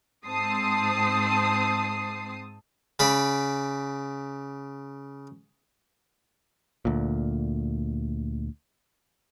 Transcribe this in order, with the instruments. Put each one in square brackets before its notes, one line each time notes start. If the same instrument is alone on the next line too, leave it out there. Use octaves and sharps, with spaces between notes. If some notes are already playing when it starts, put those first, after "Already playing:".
[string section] G#2 C4 A5 D#6 C7
[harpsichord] C#3 D5 B5
[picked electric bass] D2 A#2